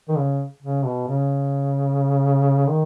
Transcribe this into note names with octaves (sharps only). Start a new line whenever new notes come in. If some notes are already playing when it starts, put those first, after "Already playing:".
D#3
C#3
C#3
B2
C#3
D#3